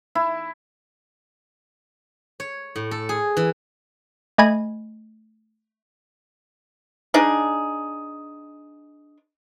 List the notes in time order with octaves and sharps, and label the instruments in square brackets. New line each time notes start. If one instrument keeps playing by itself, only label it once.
[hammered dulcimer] E4
[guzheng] C#5
A2
A4
G#4
E3
[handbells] A3 D#5 G#5 B5 G#6
[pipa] D4 D#4 G#4